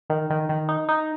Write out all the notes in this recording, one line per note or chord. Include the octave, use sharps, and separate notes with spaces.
D#3
D#3
D#3
D#4
D#4